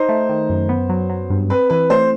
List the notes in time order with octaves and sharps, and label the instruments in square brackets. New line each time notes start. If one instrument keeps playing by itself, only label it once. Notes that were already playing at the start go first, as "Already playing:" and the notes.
Already playing: [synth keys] D#4 [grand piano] C5
[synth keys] A3
D#3
F#2
B3
F#3
F#3
G2
[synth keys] C4 [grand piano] B4
[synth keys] E3 [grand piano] B4
[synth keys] A3 [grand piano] C5